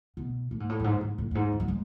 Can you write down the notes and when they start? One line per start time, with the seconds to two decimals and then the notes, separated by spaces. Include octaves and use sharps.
0.17 B2
0.51 A2
0.60 G#2
0.69 A2
0.80 F#2
0.84 G#2
1.01 G#2
1.18 A2
1.31 F#2
1.35 G#2
1.52 E3
1.60 F#3
1.68 G#3